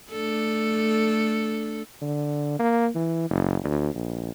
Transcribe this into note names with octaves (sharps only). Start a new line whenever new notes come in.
A3 D4 A4
D3
A#3
E3
F#1
D2
A#1